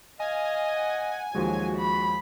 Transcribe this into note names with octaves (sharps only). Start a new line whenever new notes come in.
D#5 F5 G#5
F#5
D#2 F3 F#3 G#3 F#4
B5